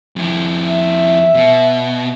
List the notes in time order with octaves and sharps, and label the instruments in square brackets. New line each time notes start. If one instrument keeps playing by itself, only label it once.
[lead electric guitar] F2 E4
[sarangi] E5
[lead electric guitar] B2